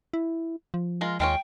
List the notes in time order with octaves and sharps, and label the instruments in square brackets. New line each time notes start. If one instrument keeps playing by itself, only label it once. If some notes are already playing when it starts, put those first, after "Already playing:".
[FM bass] E4
F3
[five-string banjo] G#3 F4 A#4
[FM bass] D#2 [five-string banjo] G#3 F4 C#5 [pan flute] G5